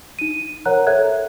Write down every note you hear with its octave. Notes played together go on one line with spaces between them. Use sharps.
D#4 D#7
A#4 C5 C#5 F#5 A#5 F#6
A4 C#5 E5 F#6 G#6